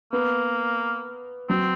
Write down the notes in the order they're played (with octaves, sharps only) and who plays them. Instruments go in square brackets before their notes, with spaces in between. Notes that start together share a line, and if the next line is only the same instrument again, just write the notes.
[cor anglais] A#3 [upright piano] B3
[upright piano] F#3 [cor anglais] C4